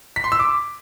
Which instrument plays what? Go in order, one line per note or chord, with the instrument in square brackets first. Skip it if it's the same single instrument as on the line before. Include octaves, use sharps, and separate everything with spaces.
[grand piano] B6
C6
E6
D6